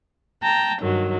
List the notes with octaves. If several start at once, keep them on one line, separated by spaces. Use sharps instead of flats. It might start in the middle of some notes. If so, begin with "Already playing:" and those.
G5 A5 A#5
G2 D#3 F#3